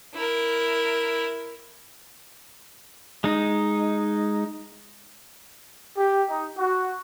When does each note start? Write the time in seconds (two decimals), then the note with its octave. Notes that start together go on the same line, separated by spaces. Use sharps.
0.14 E4 A#4
3.24 G#3 D#4
5.96 G4
6.27 D#4
6.56 F#4